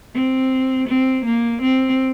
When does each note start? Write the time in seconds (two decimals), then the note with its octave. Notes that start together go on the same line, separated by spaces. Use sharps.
0.14 C4
0.88 C4
1.25 A#3
1.61 C4